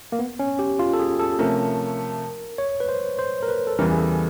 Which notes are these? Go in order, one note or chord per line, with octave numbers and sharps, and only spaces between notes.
A#3
B3
C#4
G4
F4
A4
G#4
A4
C3 F3 A3 C#4 A#4
C#5
B4
C5
C5
A#4
B4
A4
E2 C#3 E3 G3 A#4
G#4
A4